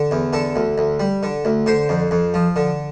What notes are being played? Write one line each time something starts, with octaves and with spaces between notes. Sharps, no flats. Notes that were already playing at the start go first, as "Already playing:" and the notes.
Already playing: D3
E2
D3 A4
D2
D2
G3
D3
D2
D3 C5
F2
F2
F3
D3